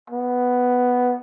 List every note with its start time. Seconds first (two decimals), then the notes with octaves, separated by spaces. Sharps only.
0.10 B3